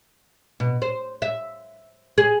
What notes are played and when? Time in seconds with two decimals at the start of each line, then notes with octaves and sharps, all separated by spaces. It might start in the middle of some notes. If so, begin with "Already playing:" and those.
0.60 B2
0.82 C5
1.22 E5
2.18 G#4